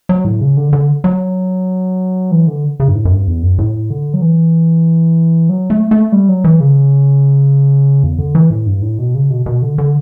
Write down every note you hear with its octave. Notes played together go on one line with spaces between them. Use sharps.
F#3
A2
C#3
D3
D3
F#3
E3
D3
C#3
G2
A2
F#2
G2
E2
F#2
A2
D3
F#3
E3
F#3
A3
A3
G3
F#3
E3
C#3
E2
D3
E3
A2
G2
A2
B2
C#3
B2
B2
D3
D3